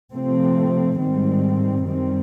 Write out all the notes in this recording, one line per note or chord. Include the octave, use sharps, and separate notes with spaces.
C3 F3 A3 C4
G#2 D#3 G3 C4
F#2 D#3 G3 C4